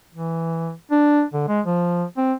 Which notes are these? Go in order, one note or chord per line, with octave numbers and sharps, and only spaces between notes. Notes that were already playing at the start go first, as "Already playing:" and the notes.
E3
D4
D3
G#3
F3
C4